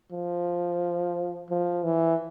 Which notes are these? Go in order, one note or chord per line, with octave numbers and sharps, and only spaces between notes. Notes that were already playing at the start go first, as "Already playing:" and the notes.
F3
F3
E3